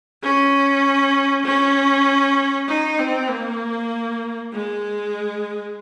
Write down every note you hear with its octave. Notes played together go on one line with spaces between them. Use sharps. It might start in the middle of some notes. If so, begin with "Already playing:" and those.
C#4
C#4
D#4
C4
A#3
G#3